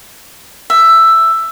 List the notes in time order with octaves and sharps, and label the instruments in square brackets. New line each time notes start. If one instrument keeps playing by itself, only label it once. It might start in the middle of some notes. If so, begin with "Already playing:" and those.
[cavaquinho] E5